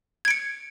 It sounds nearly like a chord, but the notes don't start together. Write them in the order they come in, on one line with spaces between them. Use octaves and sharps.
G#6 D7 C#7